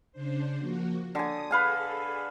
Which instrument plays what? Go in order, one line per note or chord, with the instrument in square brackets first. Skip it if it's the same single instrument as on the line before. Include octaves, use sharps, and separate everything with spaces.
[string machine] C#3 D4 C5
F3 A#3 F#4
[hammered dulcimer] D3 G#5 [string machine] D#6
[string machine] G#4 A4 [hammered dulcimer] B4 F5 G#5